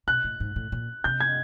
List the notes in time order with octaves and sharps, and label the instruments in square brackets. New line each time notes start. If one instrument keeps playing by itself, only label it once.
[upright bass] B2 [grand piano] F#6
[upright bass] A2
G#2
A2
A#2
[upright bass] C3 [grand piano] G6
[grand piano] G#6